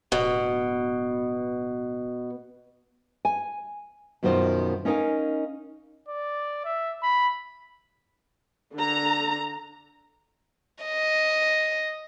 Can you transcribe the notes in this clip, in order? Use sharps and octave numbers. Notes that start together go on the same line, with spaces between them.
D1 B2
G#5
F#2 B2 D#3 F4 C5
C#4 D#4 A#4 D5 F5 G#5
D5
E5
B5
D3 A#5
D#5